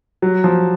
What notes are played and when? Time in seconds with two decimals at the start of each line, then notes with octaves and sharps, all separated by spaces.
0.22 F#3
0.44 F3